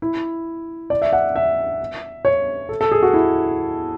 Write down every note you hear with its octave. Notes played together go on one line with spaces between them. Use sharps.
E4
D5
E5
F#5
E5
C#5
A4
A4
G#4
F#4
E4